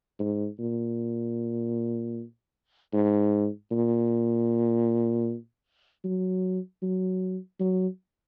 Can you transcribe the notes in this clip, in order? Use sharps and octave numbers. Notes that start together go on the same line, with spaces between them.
G#2
A#2
G#2
A#2
F#3
F#3
F#3